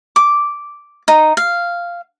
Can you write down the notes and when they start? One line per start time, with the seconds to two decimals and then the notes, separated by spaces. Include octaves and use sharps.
0.16 D6
1.08 D#4
1.37 F5